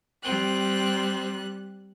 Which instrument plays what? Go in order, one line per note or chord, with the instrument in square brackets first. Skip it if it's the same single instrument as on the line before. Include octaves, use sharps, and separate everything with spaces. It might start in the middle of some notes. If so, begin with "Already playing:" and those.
[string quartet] G3 F#6 [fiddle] C4